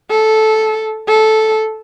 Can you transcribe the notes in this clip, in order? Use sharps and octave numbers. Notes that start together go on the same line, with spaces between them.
A4
A4